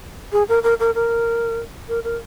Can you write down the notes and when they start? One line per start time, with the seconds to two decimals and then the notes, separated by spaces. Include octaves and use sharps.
0.32 G#4
0.49 A#4
0.63 A#4
0.80 A#4
0.95 A#4
1.89 A#4
2.04 A#4